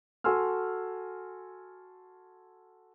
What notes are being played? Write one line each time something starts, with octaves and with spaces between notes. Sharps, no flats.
F#4 A4 G#5 C6 E6 F6